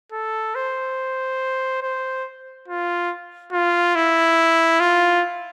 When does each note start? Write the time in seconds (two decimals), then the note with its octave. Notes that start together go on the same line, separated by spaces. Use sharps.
0.12 A4
0.55 C5
1.83 C5
2.68 F4
3.53 F4
3.96 E4
4.80 F4